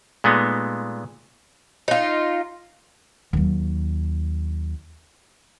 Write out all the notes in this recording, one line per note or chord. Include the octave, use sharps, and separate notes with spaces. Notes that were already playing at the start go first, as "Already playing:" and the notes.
A#2 G#3 A3 B3 D#4
D#4 F4
D#2 F#3